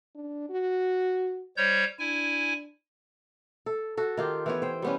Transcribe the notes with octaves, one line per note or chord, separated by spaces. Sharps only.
D4
F#4
G3 C5 C#5 G6
D4 E4 G#5
A4
F#4 A4
D#3 F4 G4
E3 B3 C#5
C5 G5
G3 B3 C#4